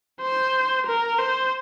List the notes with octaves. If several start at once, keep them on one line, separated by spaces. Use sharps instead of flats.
C5
A#4
C5